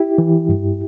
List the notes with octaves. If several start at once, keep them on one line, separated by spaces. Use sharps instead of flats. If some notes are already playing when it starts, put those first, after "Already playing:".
Already playing: E4 G4
E3
G2